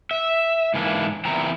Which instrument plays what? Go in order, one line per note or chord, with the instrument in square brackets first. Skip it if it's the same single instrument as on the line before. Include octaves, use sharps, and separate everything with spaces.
[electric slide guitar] E5
G#2 E3 A#3 D4 E4
E2 A#2 C4 E4 A#5